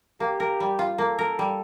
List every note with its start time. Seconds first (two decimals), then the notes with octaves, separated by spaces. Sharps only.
0.20 A#3 G4
0.40 A#4
0.60 G3
0.79 F4
0.98 A#3 A4
1.19 A#4
1.39 G3